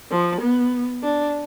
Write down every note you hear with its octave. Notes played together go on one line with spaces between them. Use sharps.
F3
B3
D4